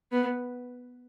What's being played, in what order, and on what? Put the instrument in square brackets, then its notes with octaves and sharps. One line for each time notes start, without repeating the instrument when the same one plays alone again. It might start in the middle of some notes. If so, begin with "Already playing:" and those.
[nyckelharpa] B3